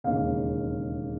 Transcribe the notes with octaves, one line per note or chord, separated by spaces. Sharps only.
E1 D#2 C#3 F5